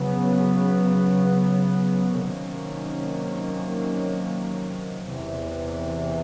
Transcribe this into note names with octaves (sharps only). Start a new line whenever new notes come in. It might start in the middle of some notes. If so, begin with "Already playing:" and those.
Already playing: C#3 F#3 B3
C3 D#3 F#3 A#3 C#4
E2 C3 E3